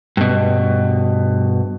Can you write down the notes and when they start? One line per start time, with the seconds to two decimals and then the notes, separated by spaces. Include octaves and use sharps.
0.17 G2 B2